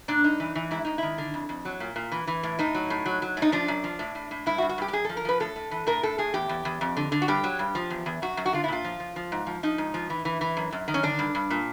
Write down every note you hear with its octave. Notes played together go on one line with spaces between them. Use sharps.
A#2 D4
G2 D#4
E3
E3
G#2 E4
G#2 D#4
D#3 E4
D3
F2
F2
F#3
A#2
A#2
E3
E3
A2
A2 D#4
F#3
A2
F#3
F#3
A2
D#4
F3 D4
F#2
F3
A2
A2
A2
G2 E4
F#4
G2
F#4
G2 G4
G4
F#2 G#4
F3 A4
A#4
F3 B4
A2 A4
A2
E3
A2 A#4
A2 A4
A2 G#4
E2 G4
E2
E2
F2
D3
D3
F#4
G2 G4
F#3
G2
F3
E2
E2
F#2 F#4
F#2
F#4
D3 F4
E4
A#2 F4
F3
F3
F3
G#2
F3
F3 D#4
G#2
F3
E3
E3
E3
F#2
F#2
D#3
C#4
D3 D4
G2
G2
A#2